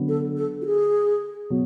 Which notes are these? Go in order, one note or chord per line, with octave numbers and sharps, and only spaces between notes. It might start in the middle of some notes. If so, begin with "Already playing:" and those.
Already playing: D3 F#3 B3
A4
A4
F#4
G#4
B2 F#3